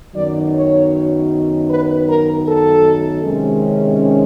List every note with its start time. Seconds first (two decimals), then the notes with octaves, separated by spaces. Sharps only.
0.14 F#2 D#3 F#3 B3 D#4 D5
0.54 C#5
1.68 B4
2.07 A#4
2.46 A4
3.23 C3 D#3 G#3 C#4